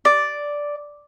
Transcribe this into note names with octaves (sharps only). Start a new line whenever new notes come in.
D5